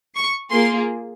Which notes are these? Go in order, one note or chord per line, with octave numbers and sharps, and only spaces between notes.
C#6
A#3 F4 G#4 C6